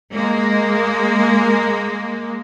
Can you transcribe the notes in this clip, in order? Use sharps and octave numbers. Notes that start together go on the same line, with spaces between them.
G#3 A#3